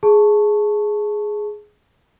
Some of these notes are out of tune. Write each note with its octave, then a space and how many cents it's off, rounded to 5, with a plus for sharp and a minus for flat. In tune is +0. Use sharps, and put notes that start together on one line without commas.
G#4 +10 A5 +0 C#6 -5